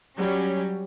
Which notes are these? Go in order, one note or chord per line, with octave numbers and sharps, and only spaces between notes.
F#3 G3 C#4